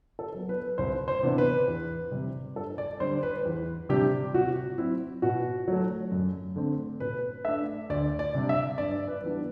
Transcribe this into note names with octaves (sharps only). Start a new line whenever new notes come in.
A4
F#3 B3
B4
C2 C5
C5
C3 E3 B3 D4
B4
E2
C3 G3
G2 A4
D5
D3 G3 C5
B4
E2
C3 G3 D4 G4
C3 F#4
F#3 C4 E4
B2 F#4
F#3 A3
F#2
D3 A3 C4
B2 B4
A3 D4 E5
D2 D5
D5
C3 G3 D4
E5
G2 D5
B4
E3 G3 B3 D4